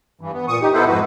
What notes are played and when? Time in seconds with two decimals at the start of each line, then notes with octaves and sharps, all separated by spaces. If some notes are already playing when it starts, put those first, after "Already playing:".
0.21 G2 E3
0.34 B3
0.48 A#2 C#6 D#6
0.61 D#4 G4
0.73 B3 D#4 E4 A4 B4 C5
0.88 F2 G#2 F#4 B4